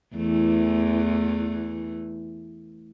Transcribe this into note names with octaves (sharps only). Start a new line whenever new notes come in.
E2 E3 A3